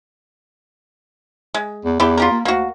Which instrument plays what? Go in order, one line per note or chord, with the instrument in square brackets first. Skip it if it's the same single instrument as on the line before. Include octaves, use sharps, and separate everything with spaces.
[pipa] G#3
[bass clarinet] E2
[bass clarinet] E2 [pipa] E4 G4
[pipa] F4 G4 A#4
[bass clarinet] A#3
[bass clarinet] D2 [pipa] A#3 F#4